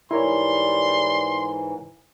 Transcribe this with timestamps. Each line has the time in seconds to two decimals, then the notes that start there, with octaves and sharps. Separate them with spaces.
0.11 G#2 E3 G3 E4 A#4 C#5 C6